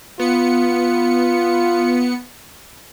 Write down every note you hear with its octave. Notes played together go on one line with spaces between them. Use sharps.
B3 F4 C#7